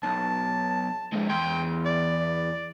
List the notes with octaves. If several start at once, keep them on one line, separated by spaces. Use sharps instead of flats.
B1 A5
F2 G#3
E2 G5 C6
D5